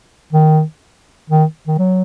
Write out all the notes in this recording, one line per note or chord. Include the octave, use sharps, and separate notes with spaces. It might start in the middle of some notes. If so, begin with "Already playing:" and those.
D#3
D#3
D#3
F#3